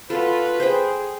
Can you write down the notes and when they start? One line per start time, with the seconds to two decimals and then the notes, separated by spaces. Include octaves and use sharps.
0.10 F4 F#4 A4 B4
0.60 G#4 C5 G5